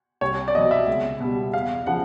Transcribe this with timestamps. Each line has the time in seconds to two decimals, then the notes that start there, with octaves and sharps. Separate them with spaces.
0.21 C2 C#5
0.48 D5
0.54 B2 D#5
0.58 F#3
0.71 E5
0.87 C#2
1.20 B2 G3
1.53 E2 F5
1.86 C#3 F3 F#5